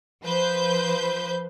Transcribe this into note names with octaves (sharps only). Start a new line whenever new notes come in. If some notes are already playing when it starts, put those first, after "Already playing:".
F3 B4 C5 G6